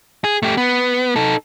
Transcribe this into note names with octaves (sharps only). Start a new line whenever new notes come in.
G#4
A3 G4
B3
D#4 A4